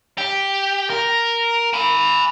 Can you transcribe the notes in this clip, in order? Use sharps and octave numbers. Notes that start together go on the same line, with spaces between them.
G4
A#4
G#5 B5